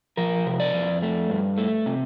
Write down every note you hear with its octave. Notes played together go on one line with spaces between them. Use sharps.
F3 A#4
C3
D5
F2
A3
G2
A3
C3